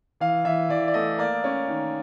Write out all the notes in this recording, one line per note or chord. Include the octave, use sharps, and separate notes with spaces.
E3 F5
E3 E5
E3 D5
D5
A3 D#5
A#3 D5
C#4
D#3